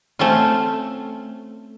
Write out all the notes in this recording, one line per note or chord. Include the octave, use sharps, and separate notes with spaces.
A3 C4 C#4 F4